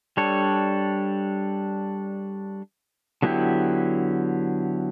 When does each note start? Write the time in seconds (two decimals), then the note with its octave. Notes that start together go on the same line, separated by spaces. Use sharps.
0.17 G3 D4 A4 C#5
3.22 D3 F#3 B3 E4 G4